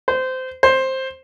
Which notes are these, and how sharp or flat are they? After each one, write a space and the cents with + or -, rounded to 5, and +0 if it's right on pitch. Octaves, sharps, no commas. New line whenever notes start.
C5 -20
C5 +10